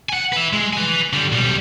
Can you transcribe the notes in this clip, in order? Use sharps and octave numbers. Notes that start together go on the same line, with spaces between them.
F#5 G#5
B4 E5
G#3
B4 G#5
D3 G3
B1 G3